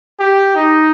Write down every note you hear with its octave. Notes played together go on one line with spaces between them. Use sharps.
G4
D#4